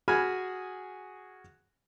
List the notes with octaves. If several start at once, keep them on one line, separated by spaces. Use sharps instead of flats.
F#4 G#4 G#5 B5 F6